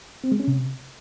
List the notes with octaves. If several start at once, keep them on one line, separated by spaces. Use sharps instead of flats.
C4
G#3
C#4
C3